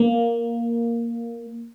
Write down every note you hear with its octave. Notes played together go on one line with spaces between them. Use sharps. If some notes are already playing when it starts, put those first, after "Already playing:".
Already playing: A#3